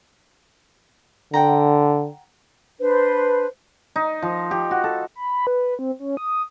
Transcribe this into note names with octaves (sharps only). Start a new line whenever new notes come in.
D3 F#5 G5 A#5
D4 B4 C5
D#4
F3
G4
F#4
A4
B5
B4
C4
C#4
D#6